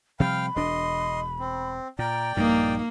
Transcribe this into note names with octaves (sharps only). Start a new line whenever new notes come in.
C3 F3 G3 F5 G5 B5 F6
E1 D4 D#5 C6
C4
A#2 D5 G5 A#5
A#1 G2 A#2 A#3 D#4